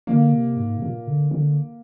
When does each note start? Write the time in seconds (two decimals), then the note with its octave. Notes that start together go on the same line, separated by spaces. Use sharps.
0.07 D3 A#3
0.32 C3
0.57 G#2
0.77 C3
0.82 A#2
1.07 D3
1.31 D3